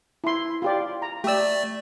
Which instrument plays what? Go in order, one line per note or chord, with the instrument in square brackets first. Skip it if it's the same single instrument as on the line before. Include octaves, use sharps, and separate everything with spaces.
[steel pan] E4 C6
F4 G4 D5
A#5
[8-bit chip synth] A3 D5 [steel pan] G4 E6